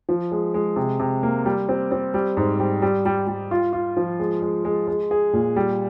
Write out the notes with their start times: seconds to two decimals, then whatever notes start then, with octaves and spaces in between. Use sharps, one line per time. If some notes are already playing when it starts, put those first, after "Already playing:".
0.09 F3
0.32 G#3
0.54 G#3
0.76 C3
1.00 C3
1.23 A#3
1.46 G3
1.69 C4
1.92 C4
2.14 G3
2.37 G#2
2.60 G3
2.82 G3
3.05 G3
3.27 G3
3.51 F4
3.73 F4
3.97 F3
4.19 G#3
4.42 G#3
4.65 G#3
4.88 G#3
5.11 G#4
5.33 A#2
5.56 G3